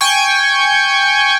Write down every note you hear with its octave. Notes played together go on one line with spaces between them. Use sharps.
G5 G#5 C#6